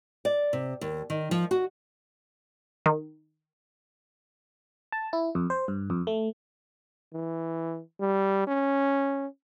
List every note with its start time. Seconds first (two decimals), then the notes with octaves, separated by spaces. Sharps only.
0.25 D5
0.53 C3
0.81 D#2
1.10 D#3
1.31 F3
1.51 F#4
2.86 D#3
4.92 A5
5.13 E4
5.35 F2
5.50 C5
5.68 G2
5.90 F2
6.07 A3
7.13 E3
8.00 G3
8.47 C#4